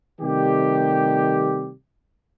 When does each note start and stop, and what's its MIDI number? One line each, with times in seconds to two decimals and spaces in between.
0.21 1.71 48
0.21 1.71 51
0.21 1.71 55
0.21 1.71 57
0.21 1.71 67